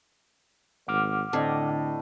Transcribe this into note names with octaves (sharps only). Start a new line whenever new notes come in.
G#1 F#5 D6 F6
A2 D3 C4 D5 D#5